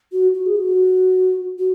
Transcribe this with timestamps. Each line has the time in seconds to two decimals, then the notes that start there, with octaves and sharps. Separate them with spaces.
0.12 F#4
0.34 F#4
0.46 G#4
0.56 F#4
1.59 F#4